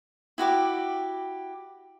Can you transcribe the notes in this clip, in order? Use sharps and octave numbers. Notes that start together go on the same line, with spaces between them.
E4 F#4 G4 D6